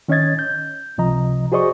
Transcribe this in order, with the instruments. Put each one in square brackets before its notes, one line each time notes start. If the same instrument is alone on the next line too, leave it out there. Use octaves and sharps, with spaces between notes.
[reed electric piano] D#3 C#4 C#5 D#5 G#6 A6
G6
C#2 C3 F3 D#5 A#5
F#4 G#4 C5 D5 D#5 C#6